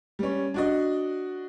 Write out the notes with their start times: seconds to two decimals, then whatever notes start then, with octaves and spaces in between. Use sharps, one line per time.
0.19 G3 C#4
0.54 D4 F#4 D#5